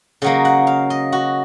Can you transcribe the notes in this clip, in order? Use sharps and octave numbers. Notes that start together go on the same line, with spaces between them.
C#3 F#3 A#3 D#5
F#5
F5
D#5
F#4